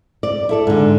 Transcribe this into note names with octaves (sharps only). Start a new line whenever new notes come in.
D5
E4 A4 D5
G#2 D3